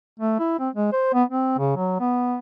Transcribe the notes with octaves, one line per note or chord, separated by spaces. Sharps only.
A3
E4
C4
G#3
C5
B3
C4
C#3
F#3
B3